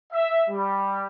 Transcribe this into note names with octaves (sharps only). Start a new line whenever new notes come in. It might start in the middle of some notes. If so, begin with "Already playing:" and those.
E5
G3